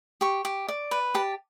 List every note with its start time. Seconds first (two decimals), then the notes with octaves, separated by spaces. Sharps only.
0.21 G4 C#6
0.45 G4
0.68 D5
0.91 B4
1.14 G4 A5